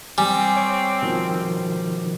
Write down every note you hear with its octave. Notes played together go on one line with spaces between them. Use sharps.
G3 C4 G#5
C#5 C#6 D6
B2 D#3 F3